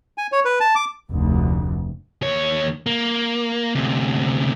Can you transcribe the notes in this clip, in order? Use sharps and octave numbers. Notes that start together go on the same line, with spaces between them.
G#5
C#5
B4
A5
D6
F1 D2
D#2 C#5
A#3
D2 C3